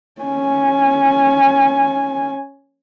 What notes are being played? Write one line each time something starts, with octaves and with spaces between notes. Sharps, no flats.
C#4 G#5